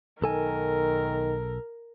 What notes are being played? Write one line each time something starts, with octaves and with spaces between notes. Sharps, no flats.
B1 D#3 A4 A#4 G#5